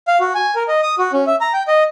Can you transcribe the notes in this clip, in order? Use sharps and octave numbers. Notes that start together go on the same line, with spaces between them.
F5
F#4
G#5
A#4
D#5
D#6
F#4
C#4
E5
A#5
G5
D#5